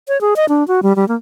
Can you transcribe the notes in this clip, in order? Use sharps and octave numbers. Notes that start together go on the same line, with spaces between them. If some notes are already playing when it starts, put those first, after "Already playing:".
C#5
G#4
D#5
D4
F#4
G3
G3
A#3